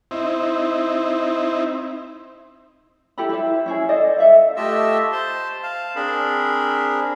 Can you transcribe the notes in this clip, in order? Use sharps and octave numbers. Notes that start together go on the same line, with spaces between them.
C4 D#4 E4
E4 G4 A4 B5
E4 C5
C#4 E4 G#4
A4 C5 D5 D#5
A4 E5 F5
A3 F4 G4 D#5 E5 E6
C5 A5 C6
F5 A5
C4 D4 G#4 A#4 B5